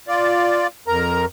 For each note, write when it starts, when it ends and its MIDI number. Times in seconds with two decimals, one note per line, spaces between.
0.08 0.67 65
0.08 0.67 74
0.87 1.25 41
0.87 1.25 70
0.87 1.25 82